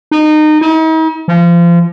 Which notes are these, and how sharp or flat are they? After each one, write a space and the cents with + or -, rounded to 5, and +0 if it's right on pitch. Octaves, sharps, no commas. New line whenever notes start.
D#4 -25
D#4 +45
F3 -30